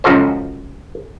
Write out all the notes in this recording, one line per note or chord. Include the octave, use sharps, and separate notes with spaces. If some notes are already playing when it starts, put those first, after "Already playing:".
C#2 F#2 F3 F#4 A4 C5